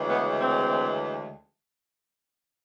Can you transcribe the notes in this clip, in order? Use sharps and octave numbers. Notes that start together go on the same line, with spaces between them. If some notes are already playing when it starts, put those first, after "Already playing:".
Already playing: D2 C#3 E3 G#3
B3
C4